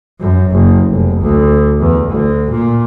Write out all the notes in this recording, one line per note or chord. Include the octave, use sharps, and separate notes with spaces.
F#2
F#1
F1
D2
E2
D2
A#2